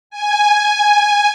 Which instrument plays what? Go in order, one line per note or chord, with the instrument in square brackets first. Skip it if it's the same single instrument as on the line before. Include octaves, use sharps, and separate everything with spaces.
[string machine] G#5